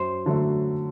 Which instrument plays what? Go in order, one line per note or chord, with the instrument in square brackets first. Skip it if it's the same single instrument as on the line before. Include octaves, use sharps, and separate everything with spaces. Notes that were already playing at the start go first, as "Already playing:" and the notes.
Already playing: [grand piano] F#2 [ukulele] C5
[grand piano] D3 F#3 A3